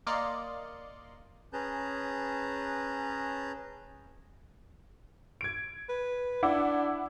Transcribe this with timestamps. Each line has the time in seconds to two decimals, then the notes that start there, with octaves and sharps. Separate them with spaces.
0.07 A#3 D5 D#5 F5 C6 C#7
1.53 C#4 G#4 B4 A5 A#5 G6
5.41 G#6 D7
5.89 B4
6.43 D4 E4 F#5 D6